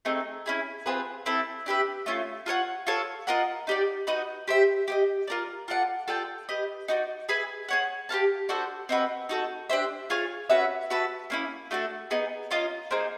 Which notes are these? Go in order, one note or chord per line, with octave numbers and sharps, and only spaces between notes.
A3 C4 D#4 G#4
C#4 E4 G#4
C4 F4 G#4 B4
C4 E4 A4
D4 G4 B4 E5
A3 C#4 F4
F4 A4 C#5 F#5
F4 A4 C#5
F4 A#4 D#5 F#5
D#4 G4 B4 D5
D#4 F#4 B4 D#5
G4 C5 E5
G4 C5 D#5
F4 A#4 D5
F4 A4 D5 F#5
F4 A4 D5 G5
G4 B4 D#5
D#4 F#4 B4 D5
G#4 B4 E5 G#5
G#4 C#5 F#5
G4 C5 F5 A5
D4 F#4 A4 C5
C4 D#4 F#4 B4
D#4 F#4 A4
D4 G4 C5 E5
F4 G#4 C#5 F5
C#4 F#4 B4 E5
F#4 B4 E5 A5
A#3 C#4 E4
A3 D4 F#4 A4
B3 D#4 G#4
C#4 F4 A#4 D#5
A#3 D#4 G#4 C5